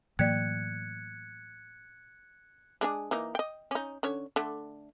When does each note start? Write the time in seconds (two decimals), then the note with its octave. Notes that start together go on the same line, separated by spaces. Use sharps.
0.19 A2 E3 F#3 A#3 D5 F#6 G#6 C#7
2.81 G#3 D4 G#4
3.11 E3 A#3 D#4
3.35 D#5 G5
3.71 C#4 D#4
4.03 D3 C#4 C#5
4.36 D3 A3